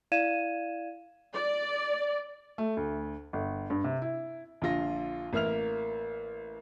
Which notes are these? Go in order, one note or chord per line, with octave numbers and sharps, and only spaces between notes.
E4 D5 F5 G#6 D#7 E7
D5
A3
D2
G1
G2
C3
E4
A#1 D3 F4 A#6
A1 A#3 E5 F6 F7